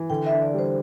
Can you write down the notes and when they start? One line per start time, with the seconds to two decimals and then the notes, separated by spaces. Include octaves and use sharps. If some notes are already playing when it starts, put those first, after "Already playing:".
Already playing: E3
0.10 D3 G5
0.26 E5
0.32 D4
0.42 D5
0.54 G3 C5